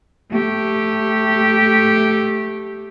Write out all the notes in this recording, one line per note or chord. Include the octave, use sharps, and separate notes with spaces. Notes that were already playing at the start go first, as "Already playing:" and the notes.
A3 G4